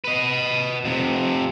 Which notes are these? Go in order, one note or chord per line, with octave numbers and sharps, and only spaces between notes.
B4 D#5
F2 C3